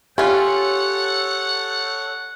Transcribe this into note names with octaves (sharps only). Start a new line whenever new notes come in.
C#4 F4 G4 A4 C#5 F#5